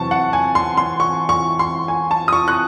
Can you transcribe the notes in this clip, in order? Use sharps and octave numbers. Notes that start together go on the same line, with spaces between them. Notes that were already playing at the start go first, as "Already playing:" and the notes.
Already playing: E2 C3 F#3 C4 A5 C#6
F#5
G#5
C6
C6
C#6
C#6
C6
G#5
A5
D#6
C#6
F#6